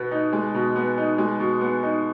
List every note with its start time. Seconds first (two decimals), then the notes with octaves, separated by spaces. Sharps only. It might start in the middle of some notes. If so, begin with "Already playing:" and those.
Already playing: B2 B3
0.11 D#4
0.33 G#3
0.54 B2
0.76 B3
0.97 D#4
1.18 G#3
1.40 B2
1.61 B3
1.83 D#4